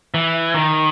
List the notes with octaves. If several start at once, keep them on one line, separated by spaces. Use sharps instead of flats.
E3
D#3